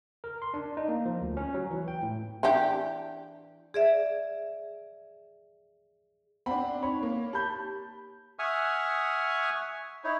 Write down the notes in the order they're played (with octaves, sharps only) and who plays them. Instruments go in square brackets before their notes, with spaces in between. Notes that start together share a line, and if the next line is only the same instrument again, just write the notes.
[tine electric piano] A#4
C6
D4
D#4
A#3
F3
D2
C#4
F#3
E3
G5
A2
[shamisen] E3 D4 G4
[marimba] G#4 D5 E5
[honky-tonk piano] C4 D4 [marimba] F#5 [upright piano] B5
[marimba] D#4 [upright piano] C#5 [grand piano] B5
[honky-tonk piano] A#3
[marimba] G4 [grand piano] A5 B5 G6
[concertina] E5 F#5 G#5 C#6 D#6 F6
D#4 E4 C#5